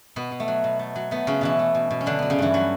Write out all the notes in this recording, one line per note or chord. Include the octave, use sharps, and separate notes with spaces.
B2 B3
B2
A3
F#3
B2
A3
F#3
A3 B3
C#3 F#3 C#4
B2 E3 E4
A3
B2
B2
C#4
D3 F#3 D4
F#3 B3
C#3 C#4
G2 E3 E4
F#3 A3 F#4